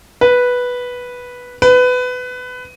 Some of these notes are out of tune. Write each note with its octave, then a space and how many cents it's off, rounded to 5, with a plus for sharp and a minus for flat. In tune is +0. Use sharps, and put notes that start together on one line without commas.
B4 -5
B4 +20